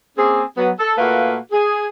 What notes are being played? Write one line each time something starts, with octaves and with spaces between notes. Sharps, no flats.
A#3 C4 C#4 G#4
F#3 B3
A4
A#2 A3 A#3 F#4 B4 F5
G#4